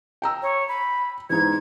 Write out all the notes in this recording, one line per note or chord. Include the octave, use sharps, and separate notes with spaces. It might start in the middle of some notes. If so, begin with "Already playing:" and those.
G5 A#5 E6
C#5
B5
E2 G#2 G#6